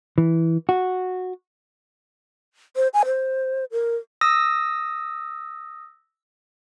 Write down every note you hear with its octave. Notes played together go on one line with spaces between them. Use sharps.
E3
F#4
C5
G#5
C5
A#4
D#6 E6 A#6